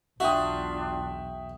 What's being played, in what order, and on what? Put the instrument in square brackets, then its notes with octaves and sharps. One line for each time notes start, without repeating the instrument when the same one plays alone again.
[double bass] B1 E2 [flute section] D4 F4 [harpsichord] F#4 [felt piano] E5 G5 D#6